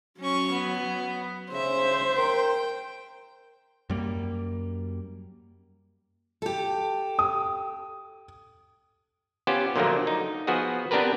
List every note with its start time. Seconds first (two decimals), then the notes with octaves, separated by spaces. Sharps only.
0.20 F#3 C#4 C#6
0.52 B3
1.52 C#3 C5 E5
2.18 A#4 G5
3.90 F#2 G3 A#3
6.42 G4 A4
7.19 D#6
9.47 B3 C#4 F4 G4 C5
9.76 A#2 D3 F3 F#3 A3 A#3
10.07 D#4
10.47 F3 B3 F#4 G#4
10.91 B3 C4 D4 G4 A#4 B4